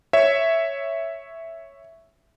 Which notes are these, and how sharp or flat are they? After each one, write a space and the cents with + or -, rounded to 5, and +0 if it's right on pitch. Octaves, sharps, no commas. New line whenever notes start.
C#5 +0 E5 +0